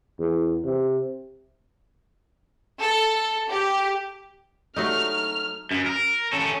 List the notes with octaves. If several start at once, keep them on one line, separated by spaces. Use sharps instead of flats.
E2
C3
A4
G4
F#3 A3 D#4 F6
F#2
A#4
C#4 A4